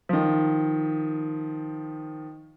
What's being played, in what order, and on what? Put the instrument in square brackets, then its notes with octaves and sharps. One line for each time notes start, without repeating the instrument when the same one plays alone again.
[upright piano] D#3 F3